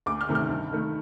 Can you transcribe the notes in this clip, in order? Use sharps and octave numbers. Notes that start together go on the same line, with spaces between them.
D2 D6
F6
C3 D#3 A3
F6
G2
D#3 A3